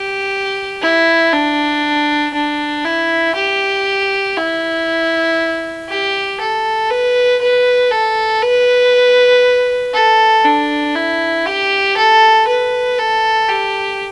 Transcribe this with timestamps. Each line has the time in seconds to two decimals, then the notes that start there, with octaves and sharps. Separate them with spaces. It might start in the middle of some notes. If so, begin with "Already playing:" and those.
Already playing: G4
0.82 E4
1.33 D4
2.34 D4
2.85 E4
3.36 G4
4.37 E4
5.89 G4
6.40 A4
6.90 B4
7.42 B4
7.91 A4
8.42 B4
9.94 A4
10.45 D4
10.96 E4
11.46 G4
11.97 A4
12.48 B4
12.98 A4
13.49 G4